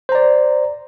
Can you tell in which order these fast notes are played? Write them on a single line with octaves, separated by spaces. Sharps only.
C5 A#5 D5